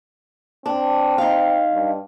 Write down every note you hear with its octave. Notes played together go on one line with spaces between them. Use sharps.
C4 D4
D#4 F5
G2